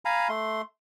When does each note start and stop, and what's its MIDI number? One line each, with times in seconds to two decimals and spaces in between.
0.05 0.28 77
0.05 0.28 80
0.05 0.28 82
0.05 0.28 83
0.29 0.62 57
0.29 0.62 84